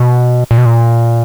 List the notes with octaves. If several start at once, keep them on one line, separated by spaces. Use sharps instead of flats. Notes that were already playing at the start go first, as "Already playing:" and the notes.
Already playing: B2
A#2
B2
A#2